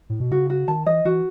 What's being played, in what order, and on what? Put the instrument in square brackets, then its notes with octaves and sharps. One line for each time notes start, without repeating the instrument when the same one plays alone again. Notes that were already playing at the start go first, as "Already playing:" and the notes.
[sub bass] A2
B2
[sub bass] C#3 [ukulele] F#4
[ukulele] F#4
[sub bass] D#3 [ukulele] A5
[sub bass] E3 [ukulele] D#5
[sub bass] E3 [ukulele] F#4